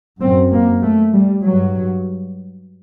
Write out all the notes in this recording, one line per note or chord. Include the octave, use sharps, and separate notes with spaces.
F#2 C4
A#3
A3
G3
G2 F#3